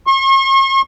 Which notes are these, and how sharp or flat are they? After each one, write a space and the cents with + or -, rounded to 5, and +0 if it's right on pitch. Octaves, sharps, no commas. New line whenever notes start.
C#6 -45